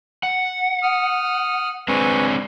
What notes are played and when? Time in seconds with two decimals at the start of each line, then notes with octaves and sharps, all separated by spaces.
0.23 F#5
0.82 D#6 F6
1.88 G#3 C4 D4 B4 G#5 C#6